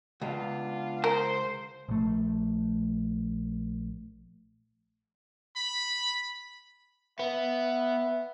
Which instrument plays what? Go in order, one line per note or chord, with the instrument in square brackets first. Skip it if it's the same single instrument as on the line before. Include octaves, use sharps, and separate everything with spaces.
[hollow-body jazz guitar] C#2 [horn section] B3 D4 F4
[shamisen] A#4 [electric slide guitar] C5
[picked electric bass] A#1 A3
[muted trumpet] B5
[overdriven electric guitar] B3 [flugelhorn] E5